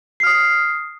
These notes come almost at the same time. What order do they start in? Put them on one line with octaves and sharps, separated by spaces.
C7 F6 D#6